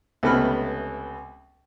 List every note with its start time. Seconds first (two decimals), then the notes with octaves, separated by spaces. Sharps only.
0.23 C#2 C3 A3 B3 B5 F6